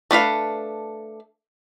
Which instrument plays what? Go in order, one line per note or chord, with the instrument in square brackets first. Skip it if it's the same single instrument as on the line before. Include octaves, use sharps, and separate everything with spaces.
[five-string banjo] A3 D4 B4 F5